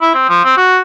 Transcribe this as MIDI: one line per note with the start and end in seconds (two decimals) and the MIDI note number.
0.02 0.11 64
0.15 0.25 60
0.29 0.41 53
0.44 0.56 60
0.57 0.79 66